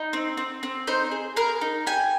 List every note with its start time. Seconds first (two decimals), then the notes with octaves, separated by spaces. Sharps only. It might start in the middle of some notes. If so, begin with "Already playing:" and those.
Already playing: D#4
0.13 C4
0.37 C4
0.63 C4
0.87 D#4 C5
1.11 G#4
1.36 G#4 A#4
1.61 D#4
1.87 G4 G#5